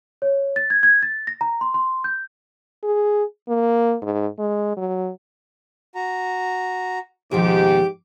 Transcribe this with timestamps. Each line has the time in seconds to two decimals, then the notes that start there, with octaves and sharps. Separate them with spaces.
0.22 C#5
0.56 A6
0.70 G#6
0.83 G#6
1.03 A6
1.27 A#6
1.41 A#5
1.61 C6
1.74 C6
2.04 G6
2.83 G#4
3.49 A#3
4.02 G#2
4.39 G#3
4.77 F#3
5.95 F#4 A#5
7.31 D#2 G#2 B2 F3 G4 D6